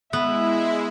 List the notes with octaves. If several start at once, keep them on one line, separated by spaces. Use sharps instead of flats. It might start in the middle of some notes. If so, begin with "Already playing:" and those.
G#3 B3 E4 E5